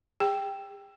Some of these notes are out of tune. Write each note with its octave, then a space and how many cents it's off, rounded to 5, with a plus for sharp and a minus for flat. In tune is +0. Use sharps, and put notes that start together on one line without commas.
G#4 -45 G5 +0